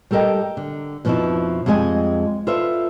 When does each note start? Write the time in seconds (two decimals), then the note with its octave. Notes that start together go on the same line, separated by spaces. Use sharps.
0.11 G3 G4 A4 A#4 D#5 G5
0.57 D3
1.05 F2 B2 F3 C#4 D#4 E4
1.66 F2 G3 G#3 D#5 G#5
2.47 F4 A4 B4 C5 D5 E5